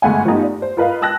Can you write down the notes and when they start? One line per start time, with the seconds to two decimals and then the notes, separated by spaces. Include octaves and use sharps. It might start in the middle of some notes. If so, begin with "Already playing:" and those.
0.02 G1 G#3 A3 F#5 G#5
0.25 F3 A3 B3 D#4 G4
0.43 D5
0.62 C5
0.77 F4 A#4 B4 D#5 F5
1.01 G5 A5 E6 F#6 A#6